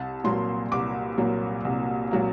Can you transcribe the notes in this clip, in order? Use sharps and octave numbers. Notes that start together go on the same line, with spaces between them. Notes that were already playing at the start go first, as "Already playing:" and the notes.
Already playing: C2 A5
A#2 F#3 A#3 C6
C2 D6
A#2 F#3 A#3
C2
A#2 F#3 A#3